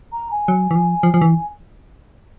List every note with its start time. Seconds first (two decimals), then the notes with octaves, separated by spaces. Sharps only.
0.12 A#5
0.31 G#5
0.48 F#3
0.71 E3
0.75 F3
1.03 F3
1.14 F3
1.21 E3